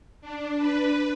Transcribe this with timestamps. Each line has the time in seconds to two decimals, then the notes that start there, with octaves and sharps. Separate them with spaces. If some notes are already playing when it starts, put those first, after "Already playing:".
0.21 D4
0.58 B4